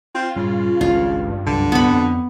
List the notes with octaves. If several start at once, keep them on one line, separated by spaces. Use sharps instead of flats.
C4 F4
G2 A#2 C#3 G3
G#1 C#2 G2 C#4 F4
C2 F#2 D3
B3 B5
F2 C4